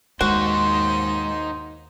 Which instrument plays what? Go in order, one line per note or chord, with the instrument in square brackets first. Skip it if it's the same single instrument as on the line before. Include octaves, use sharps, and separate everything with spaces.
[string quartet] D#2 C6 [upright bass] G#3 [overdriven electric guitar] D#4 C5 [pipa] F#4